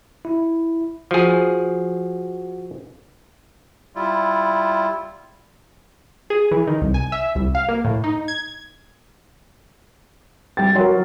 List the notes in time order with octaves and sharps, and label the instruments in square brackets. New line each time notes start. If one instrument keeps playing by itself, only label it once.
[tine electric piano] E4
[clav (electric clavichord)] F3 G#4 [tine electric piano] F#4
[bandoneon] G3 E4 F4
[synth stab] G#4
E3
D#3
C2
G#5
E5
C2
F5
A#3
A2
D#4
G#6
[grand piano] G3 G5 A6
[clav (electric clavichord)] F#3 [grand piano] A#4 G5 C6